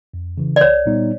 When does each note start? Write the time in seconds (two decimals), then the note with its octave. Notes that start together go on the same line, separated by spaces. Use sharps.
0.14 F2
0.38 C#3 E3
0.56 D5
0.61 C2 C#5
0.86 A#2 G3 B3 D#4